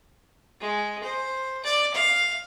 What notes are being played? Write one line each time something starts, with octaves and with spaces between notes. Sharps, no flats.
G#3
C5
D5
F5